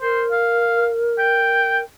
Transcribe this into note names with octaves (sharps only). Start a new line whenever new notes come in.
A#4 C5
F5
G5